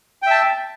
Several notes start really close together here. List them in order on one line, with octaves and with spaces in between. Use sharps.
G5 E5 A5